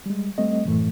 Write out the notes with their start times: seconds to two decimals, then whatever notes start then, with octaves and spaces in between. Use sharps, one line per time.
0.06 G3 G#3
0.38 G3 A3 C4 D#5
0.65 F#2 A2 E3 A3